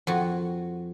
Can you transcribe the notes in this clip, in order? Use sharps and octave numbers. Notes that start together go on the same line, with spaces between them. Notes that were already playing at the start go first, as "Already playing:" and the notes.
F2 F#4